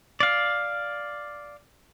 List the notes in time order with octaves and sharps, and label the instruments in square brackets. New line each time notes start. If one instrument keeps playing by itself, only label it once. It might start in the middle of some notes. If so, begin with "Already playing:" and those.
[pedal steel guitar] D5 F5